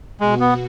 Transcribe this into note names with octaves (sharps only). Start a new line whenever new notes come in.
B2 G#3 B3 F#4
B3